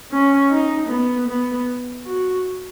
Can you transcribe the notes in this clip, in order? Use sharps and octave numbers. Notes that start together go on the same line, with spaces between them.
C#4
D#4
B3
B3
F#4